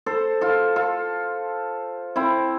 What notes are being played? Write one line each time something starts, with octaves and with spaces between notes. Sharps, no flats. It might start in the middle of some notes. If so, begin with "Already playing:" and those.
A4 C5
F4 A4
F4 A4
C4 E4